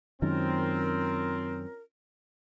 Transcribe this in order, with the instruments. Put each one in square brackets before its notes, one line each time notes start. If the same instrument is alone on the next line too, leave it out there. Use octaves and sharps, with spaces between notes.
[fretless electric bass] F#2 D#3 G#3 [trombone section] C4 [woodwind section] C#4 F4 A#4